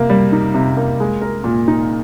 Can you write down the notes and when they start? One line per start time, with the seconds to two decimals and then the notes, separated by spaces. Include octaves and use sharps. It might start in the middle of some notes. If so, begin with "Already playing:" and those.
Already playing: C3 A#3
0.10 G3
0.32 D#4
0.54 C3
0.77 A#3
1.00 G#3
1.22 A#4
1.44 A#2
1.68 D#4